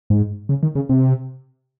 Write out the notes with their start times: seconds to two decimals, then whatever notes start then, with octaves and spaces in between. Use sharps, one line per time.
0.10 G#2
0.49 C#3
0.63 D#3
0.75 C#3
0.89 C3